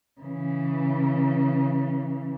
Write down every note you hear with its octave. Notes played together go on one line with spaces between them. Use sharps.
C#3 E3